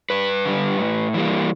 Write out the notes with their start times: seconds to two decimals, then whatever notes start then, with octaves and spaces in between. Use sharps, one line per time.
0.10 G2 B4
0.45 D3 G3
0.79 A2
1.14 E3 G3 A#3